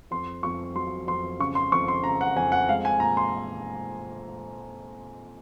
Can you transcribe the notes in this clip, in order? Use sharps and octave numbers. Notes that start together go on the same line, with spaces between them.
F2 C6
F2 C#6
F#3 C6
F2 C6
C#3 C#6
C6
F2 C#6
C6
C#3 A#5
F#5
F2 G#5
F#5
G#3 F5
G#5
A#2 A#5
C6